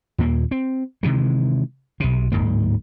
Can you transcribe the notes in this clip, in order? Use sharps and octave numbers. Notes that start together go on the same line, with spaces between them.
D#2 A#2 A#3
C4
C3 D#3 E3 G#3
B1 C3
D1 G#1 G#2 A#3